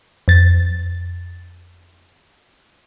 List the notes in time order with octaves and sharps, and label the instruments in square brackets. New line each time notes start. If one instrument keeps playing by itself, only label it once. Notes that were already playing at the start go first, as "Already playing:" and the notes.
[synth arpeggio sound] F2 A6